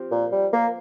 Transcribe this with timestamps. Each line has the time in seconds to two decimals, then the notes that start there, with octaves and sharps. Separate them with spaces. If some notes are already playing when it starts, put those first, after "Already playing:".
Already playing: F3 C4 G4
0.11 A#2
0.32 G3
0.53 A#3